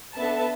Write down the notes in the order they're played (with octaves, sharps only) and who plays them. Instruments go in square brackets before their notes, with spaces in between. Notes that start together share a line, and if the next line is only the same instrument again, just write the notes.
[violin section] B3 D4 A4 E5 A5